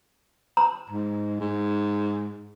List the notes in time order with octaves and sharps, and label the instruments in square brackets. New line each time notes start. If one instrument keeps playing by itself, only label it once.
[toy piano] A#5
[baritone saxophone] G#2
G#2